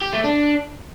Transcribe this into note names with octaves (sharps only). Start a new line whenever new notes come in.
G4
A3
D4